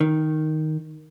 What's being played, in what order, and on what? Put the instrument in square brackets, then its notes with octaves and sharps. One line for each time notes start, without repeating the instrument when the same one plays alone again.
[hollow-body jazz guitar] D#3